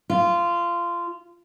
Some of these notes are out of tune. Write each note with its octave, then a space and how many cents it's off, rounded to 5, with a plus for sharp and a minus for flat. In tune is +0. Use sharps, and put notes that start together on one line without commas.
F4 -15